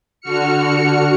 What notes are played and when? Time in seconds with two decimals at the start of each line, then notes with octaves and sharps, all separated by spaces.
0.21 D3 F#4 F6 C#7